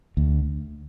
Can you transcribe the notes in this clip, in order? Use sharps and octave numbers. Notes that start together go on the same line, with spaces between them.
D2